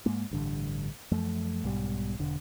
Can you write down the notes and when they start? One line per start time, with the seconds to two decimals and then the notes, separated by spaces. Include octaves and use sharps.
0.06 G#2 G#3 A#3
0.31 A1 G2 D3
1.12 F#2 F3 A3
1.64 B1 G#2 B2 G3
2.19 E1 D3